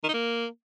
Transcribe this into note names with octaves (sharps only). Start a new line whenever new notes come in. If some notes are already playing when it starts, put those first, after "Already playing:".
D#3
D#4
A#3